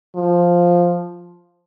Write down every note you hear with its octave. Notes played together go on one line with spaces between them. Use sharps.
F3